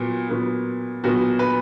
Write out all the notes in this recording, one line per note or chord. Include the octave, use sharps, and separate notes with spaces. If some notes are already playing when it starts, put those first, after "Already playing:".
Already playing: A#2 F#3 B3
A#2 F#3 B3
A#2 F#3 B3 F#4
B4